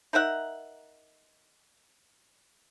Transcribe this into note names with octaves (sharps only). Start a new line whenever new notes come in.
D#4 A#4 E5 F#5